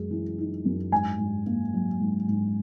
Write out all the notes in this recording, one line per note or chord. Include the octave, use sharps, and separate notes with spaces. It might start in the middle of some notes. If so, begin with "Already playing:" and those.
Already playing: F#2 G#3
E3
D#4
F#2
G#2 G#5
G#2
A#3
F#3
G#2
G#2